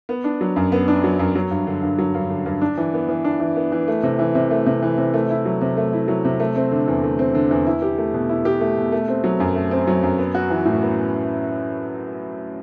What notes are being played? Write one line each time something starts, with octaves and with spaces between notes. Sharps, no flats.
B3
D4
F#3
F#2
B3
D4
F#3
F#2
F#3
G2
D3
G2
F#3
G2
D3
G2
D4
E3
B3
E3
D4
E3
B3
E3
A3
C3
E3
C3
A3
C3
E3
C3
A3
E4
F#3
C3
A3
E4
F#3
C3
A3
C4
D3
E2
A3
C4
D3
E2
E4
G4
A3
B2
E4
G4
A3
B2
A3
C4
F#3
F#2
A3
C4
F#3
F#2
B3
F#4
E3
A2
B3